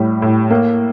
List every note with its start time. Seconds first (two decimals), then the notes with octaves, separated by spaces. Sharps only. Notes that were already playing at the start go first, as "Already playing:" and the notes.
Already playing: A2 G3
0.22 A2
0.50 A#3